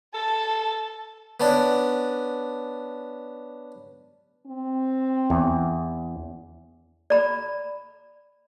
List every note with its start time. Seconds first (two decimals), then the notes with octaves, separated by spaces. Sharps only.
0.15 A4 A5
1.40 B3 C#4 D4 A5
4.46 C4
5.30 E2
7.10 D5 A#5 B5